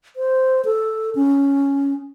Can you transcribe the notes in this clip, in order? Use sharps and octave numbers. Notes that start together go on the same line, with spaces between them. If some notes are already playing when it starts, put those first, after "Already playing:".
C5
A4
C#4